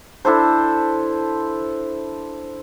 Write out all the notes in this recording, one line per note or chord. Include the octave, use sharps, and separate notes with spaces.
D4 E4 A4 C5